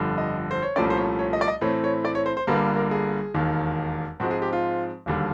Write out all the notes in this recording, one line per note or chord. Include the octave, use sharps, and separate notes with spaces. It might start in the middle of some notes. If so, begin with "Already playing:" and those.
Already playing: G1 F2 D3 G3
D#5
C5
C#5
C2 A#2 F3 A3 C#4 D5
C5
C#5
C#5
D#5
D5
D#5
A2 E3 A3 C4 C#5
C#5
D5
C#5
C5
C5
G1 G2 D3 G3 A#3 B4
A#4
G#4
E1 D#2 D#3
G#2 F3 G#3 C4 F#4
G#4
G4
F4
E1 D#2 D3 G3